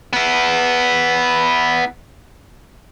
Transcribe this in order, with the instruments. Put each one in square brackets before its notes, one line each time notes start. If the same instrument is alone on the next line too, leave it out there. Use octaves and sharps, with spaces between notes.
[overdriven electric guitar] B3 E4